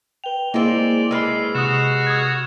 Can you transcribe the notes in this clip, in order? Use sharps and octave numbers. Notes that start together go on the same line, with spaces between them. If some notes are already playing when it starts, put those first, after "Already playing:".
B4 G5 F7 G7
G#3 A#3 C4 E4 D5 F7
G#3 B4 E6 F6 C7
C3 F#4 D#6 E7
D#6 F#6 G#6